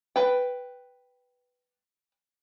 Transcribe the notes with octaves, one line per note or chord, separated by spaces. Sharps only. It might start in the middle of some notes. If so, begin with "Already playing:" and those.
B4 G5